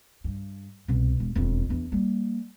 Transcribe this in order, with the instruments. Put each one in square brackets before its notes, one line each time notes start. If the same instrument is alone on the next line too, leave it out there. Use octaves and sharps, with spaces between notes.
[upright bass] G2
C2 B2
E1
E1 F2
E2 D4
G3 A#3